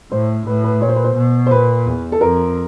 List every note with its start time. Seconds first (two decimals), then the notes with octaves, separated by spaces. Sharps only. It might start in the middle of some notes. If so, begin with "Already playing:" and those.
0.11 A2 C5
0.47 A2 B4
0.64 B4
0.81 A#2 C#5
0.88 C5
0.96 B4
1.04 C5
1.16 B2
1.46 C5
1.51 A#2 B4
1.86 E2
2.12 A4
2.21 F2 A#4